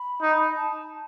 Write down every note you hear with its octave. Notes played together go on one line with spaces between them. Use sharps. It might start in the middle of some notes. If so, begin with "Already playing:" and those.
Already playing: B5
D#4
A5